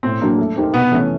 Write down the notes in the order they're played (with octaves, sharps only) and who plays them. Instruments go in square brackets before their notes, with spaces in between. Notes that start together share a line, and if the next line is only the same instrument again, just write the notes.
[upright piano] A2 [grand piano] C4
[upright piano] F#3 A#3 D4
A3
C4 D#4 G4 A#4
[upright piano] C3 [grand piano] B3
[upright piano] E3 A3 C#4